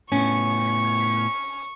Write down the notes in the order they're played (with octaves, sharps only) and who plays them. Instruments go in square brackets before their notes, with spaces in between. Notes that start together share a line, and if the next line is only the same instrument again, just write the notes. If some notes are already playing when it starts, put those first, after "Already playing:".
[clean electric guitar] A2 B3 [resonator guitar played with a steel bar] C#4 [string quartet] C#6